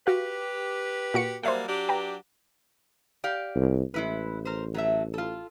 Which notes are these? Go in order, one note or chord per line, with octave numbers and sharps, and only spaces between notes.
F#4 G4 B4 F5
A#2 F#4 C#7
F#3 G3 A#3 C5 E5 F#5
F#3 D4 G4
B4 G5 A#5
G4 D5 F5
C2
A1 G#3 E4 B4
A#4 C5
F#3 A3 E5
F4 A4